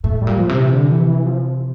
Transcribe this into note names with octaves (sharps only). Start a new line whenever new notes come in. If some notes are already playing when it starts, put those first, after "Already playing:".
A2 A3
G3
A#2
F3
C3
E3
D3
E3
E3
F3